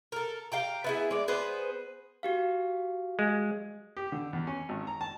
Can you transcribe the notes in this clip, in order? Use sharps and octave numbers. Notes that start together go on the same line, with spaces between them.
A4 A#4
G4 F5 G5 A#5
B3 E4 G#4
G#3 D5
B3 G#4 B4 C5
F#4 G4 F5
G#3
G4
D3
E2
C#4
G#1
A#5
A5